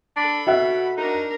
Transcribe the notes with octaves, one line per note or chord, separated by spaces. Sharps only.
D4 A4 B5
B2 F#4 E5 F#5
D4 D#4 A#4